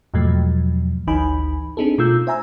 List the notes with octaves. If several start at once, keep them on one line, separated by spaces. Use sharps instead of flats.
E2 G#2 B2 F3 F#3 A3
G#1 D2 E3 D#4 G#5 B5
C4 D4 D#4 G#4 A4
B2 A3 F4 E6 G6
C5 E5 G#5 A#5 E6